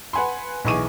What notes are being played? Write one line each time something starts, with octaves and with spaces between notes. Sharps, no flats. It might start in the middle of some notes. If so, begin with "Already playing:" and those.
B4 F#5 G#5 B5 C6
B1 E3 G#4 C#6 D6 D#7